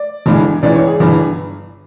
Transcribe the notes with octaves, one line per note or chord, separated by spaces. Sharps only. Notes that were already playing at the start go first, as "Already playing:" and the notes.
Already playing: D5
G1 G2 E3 G#3
C#2 C#3 E3 D5
C#5
G#4
G1 G2 E3